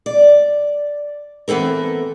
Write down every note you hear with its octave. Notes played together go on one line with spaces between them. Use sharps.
D5
E3 B3 C4 A4 A#4